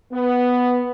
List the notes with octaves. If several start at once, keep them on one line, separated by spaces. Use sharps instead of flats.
B3